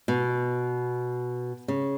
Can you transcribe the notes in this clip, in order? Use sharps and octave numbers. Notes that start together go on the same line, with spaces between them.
B2
C#3